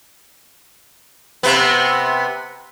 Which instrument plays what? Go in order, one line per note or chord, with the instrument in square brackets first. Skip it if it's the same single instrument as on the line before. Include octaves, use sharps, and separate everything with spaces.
[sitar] C3 B3